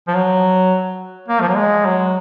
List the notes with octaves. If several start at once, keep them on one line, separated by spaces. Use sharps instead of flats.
F3
F#3
A#3
F3
F#3
G#3
F#3